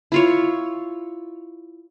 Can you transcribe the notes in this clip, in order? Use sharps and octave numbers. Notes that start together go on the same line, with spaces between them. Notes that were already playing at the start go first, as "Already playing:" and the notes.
E4 F4 C#5